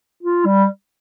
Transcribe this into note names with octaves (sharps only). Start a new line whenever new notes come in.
F4
G3